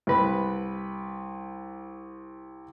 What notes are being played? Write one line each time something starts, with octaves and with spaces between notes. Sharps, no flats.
C2 B4 B5